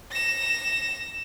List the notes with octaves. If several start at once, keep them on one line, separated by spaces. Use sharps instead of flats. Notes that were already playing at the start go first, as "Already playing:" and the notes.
A#6 E7